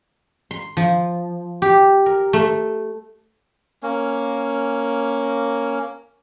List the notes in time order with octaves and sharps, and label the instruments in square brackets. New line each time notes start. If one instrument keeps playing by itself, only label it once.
[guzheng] C6
F3
G4
A#4
A3
[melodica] A#3 C#4